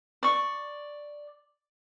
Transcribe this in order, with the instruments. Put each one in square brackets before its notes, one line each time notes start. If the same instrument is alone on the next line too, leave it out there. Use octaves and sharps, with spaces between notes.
[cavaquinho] D5 C#6